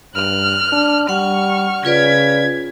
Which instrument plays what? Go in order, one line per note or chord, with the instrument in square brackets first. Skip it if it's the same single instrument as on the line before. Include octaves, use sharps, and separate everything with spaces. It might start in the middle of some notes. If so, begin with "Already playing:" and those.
[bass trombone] G2 [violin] F6 F#6
[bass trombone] D4
[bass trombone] G3 [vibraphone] F#5 [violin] C#6 F6
[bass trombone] C#3 [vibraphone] F4 B4 D5 [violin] G#6 B6